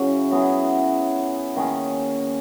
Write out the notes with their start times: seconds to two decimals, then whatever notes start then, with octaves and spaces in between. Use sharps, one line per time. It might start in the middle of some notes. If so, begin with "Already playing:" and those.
Already playing: C#3 F#3 C#4 E4
0.31 F#3 B3 E4 G#4
1.56 D#3 A#3 C#4 G#4